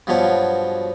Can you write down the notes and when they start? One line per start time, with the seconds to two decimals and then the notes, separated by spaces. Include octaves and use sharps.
0.07 G2 B2 F3 F#3 C#5